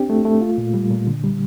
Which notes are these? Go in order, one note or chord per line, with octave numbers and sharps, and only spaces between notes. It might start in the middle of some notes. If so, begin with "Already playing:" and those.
Already playing: C4 D4 G4
A3
A3
F4
A#2
G3
A#2
D3
G3